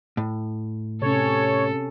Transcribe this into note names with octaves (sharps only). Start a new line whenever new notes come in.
A2
C3 C#4 A4 C#5